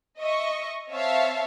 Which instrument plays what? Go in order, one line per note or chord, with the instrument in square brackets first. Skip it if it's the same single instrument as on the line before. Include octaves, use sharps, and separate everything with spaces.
[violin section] D#5 E5 C#6
C4 C#5 E5 F5 A5